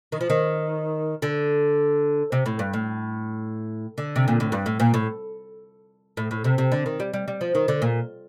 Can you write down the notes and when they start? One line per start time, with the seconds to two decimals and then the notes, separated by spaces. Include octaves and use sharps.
0.12 D#3
0.21 F3
0.30 D#3
1.22 D3
2.32 C3
2.46 A2
2.59 G2
2.73 A2
3.98 D3
4.16 C3
4.28 A#2
4.40 A2
4.52 G2
4.66 A2
4.80 A#2
4.94 A2
6.17 A2
6.31 A2
6.44 C3
6.58 C3
6.72 D3
6.86 D#3
7.00 G3
7.14 G3
7.28 G3
7.41 F3
7.55 D#3
7.68 D3
7.82 A#2